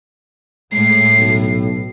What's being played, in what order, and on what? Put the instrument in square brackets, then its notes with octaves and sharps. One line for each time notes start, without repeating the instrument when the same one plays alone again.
[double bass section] A2 [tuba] G#3 [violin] C7
[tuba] B1